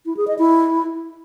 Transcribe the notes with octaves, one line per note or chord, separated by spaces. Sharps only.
E4
G#4
D#5
E4